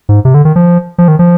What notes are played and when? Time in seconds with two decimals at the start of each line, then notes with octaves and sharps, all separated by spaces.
0.09 G#2
0.25 C3
0.34 D3
0.45 D#3
0.56 F3
0.98 F3
1.08 D#3
1.19 F3